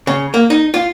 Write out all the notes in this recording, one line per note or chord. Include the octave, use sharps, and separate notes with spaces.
C#3
A#3
D#4
F4